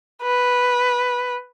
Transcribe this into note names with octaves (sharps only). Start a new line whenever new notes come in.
B4